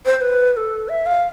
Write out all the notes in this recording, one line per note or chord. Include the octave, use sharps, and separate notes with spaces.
C5
C5
B4
B4
A4
E5
F5